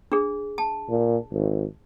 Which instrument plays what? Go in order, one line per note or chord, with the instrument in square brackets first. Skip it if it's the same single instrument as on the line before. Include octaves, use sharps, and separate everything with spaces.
[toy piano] D4 G#4
A5
[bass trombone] A#2
G#1